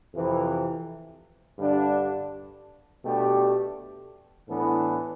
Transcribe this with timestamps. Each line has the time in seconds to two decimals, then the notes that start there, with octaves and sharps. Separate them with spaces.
0.14 F2 C3 E3
1.58 G2 D3 G3 D4
3.03 B2 A3 D4 G4
4.48 A2 E3 B3 D4 A4